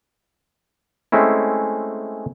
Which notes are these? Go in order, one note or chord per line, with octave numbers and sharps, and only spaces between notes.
G#3 A3 C4 C#4 E4